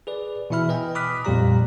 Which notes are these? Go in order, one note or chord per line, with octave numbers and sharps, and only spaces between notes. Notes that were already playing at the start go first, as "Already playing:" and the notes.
G#4 B4 D5
B2 E3 E4 E5 B5 F6
B4 D#5 G5 G#5
B5 D6 D#6 F6 F#6 B6
F2 A#2 G3 G4 D5 A#5